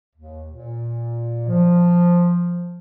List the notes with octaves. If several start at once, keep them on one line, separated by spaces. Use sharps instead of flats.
D#2
A#2
F3